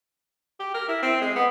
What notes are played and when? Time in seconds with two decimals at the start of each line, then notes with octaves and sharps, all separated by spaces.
0.60 G4
0.74 A#4
0.88 E4
1.02 C4
1.21 G#3
1.36 B3